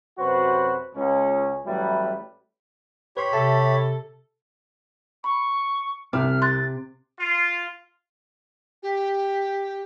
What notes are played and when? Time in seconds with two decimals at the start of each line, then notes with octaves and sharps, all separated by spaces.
0.18 F#2 C3 F#4 B4 C5
0.95 C#2 C#4
1.65 A1 F#3 G3 A3 E4 B4
3.17 G4 B4 C#5 B5 C6
3.33 C3 A4 E5 A5
5.24 B5 C#6
6.13 C2 C3 D6 F6
6.42 C6 F#6 A6
7.19 F4
8.83 G4